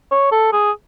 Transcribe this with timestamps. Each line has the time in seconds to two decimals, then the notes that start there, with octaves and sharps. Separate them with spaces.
0.11 C#5
0.32 A4
0.53 G#4